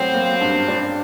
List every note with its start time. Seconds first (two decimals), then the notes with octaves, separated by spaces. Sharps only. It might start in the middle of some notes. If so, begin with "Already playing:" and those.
Already playing: A2 F#3 C4
0.14 A#3
0.41 G2
0.68 D4